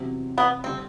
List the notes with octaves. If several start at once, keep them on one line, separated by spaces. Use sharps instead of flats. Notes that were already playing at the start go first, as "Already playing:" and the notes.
Already playing: E2 C3 F#3 C4
B3
D3 G3 C4 D4